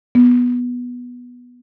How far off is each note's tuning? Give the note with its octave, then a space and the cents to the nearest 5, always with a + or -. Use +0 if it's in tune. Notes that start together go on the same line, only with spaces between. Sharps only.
B3 -10